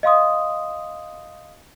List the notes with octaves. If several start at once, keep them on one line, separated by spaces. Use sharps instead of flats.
D#5 F5 C6 D#6